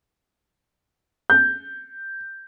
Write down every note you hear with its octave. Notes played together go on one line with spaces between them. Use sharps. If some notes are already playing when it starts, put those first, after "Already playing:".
G6